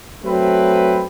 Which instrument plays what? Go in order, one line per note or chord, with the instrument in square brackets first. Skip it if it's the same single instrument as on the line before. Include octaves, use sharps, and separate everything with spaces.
[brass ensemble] F#3 A3 C4 B4